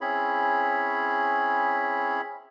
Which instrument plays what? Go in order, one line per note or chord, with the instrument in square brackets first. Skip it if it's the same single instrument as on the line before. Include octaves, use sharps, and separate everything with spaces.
[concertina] C4 C#4 E4 G#4 C#5 B5